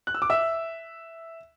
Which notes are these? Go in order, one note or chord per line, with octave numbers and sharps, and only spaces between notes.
F#6
E6
D6
E5 E6